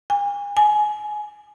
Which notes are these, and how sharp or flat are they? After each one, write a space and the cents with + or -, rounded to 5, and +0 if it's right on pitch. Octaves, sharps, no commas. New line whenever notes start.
G#5 -35
G#5 +20